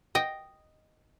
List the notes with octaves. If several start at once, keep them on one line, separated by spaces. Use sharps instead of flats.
D#5 G5